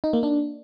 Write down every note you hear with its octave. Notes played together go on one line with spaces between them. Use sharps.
D#4
A#3
D4